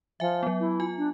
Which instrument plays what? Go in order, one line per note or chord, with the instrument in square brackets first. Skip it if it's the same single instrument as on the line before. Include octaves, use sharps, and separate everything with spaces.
[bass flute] F3 [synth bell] E5 G#5
[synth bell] F#3 B3
[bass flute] E4
[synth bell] F4 G#5
[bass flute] D4